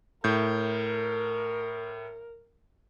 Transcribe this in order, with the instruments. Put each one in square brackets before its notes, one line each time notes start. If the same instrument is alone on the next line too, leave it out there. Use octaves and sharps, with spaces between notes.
[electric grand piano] A2 G6 [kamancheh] A#4